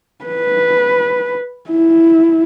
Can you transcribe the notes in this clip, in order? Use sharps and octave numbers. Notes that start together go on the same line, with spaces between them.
B4
E4